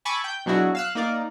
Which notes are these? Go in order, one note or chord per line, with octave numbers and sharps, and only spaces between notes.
G#5 A5 B5 C#6 D6 E6
G5 G6
B2 F#3 D4 E4 F#4 G#4
F5 E6 F#6
A#3 D#4 A#4 D5